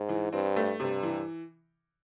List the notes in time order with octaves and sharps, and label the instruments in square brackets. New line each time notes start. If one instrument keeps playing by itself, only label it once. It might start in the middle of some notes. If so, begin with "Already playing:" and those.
Already playing: [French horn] G#2
[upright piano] E3
[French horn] G2 [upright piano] C4
[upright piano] A3
[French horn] G2 [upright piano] C3
[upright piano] E3